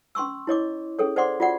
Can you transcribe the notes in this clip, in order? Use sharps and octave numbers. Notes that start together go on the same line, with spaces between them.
C#4 C6 C#6 E6
E4 C#5 D#5 D6
C#4 G#4 A4 C#5
C5 D5 F#5 C6 D6
F4 F#4 D5 F#5